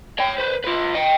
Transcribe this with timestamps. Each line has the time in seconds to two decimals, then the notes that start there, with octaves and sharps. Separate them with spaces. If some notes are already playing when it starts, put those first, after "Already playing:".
0.19 C#5 G5
0.39 B4 C5
0.65 F4 B4
0.95 D#5 G5